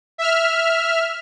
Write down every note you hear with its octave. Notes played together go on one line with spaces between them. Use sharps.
E5 F6